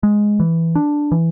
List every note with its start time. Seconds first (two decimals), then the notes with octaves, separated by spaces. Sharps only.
0.03 G#3
0.40 E3
0.75 D4
1.12 E3